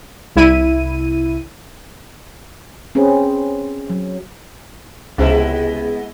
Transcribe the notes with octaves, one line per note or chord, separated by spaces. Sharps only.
C2 E4 D#7
C4 C#4 G#4 B4
F#3
C#2 C3 G#3 B3 E4